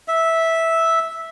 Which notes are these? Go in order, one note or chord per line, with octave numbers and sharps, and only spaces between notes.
E5